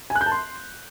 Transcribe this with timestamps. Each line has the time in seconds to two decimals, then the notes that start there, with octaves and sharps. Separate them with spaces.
0.10 G#5
0.15 F#6
0.21 G6
0.26 A5
0.32 C6